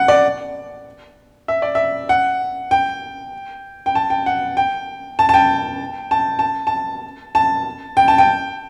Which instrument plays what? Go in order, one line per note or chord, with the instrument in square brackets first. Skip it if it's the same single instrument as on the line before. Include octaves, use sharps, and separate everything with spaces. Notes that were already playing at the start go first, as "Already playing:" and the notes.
Already playing: [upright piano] F#5
D5
E5
D5
E5
F#5
G5
G5
A5
G5
F#5
G5
A5
A5
G5
A5
A5
A5
A5
G5
A5
G5